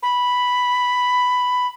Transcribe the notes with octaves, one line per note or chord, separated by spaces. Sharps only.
B5